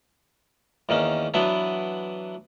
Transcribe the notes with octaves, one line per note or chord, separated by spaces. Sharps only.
E2 D#3 A#3 C#4
E3 F#3 B3 D4 E4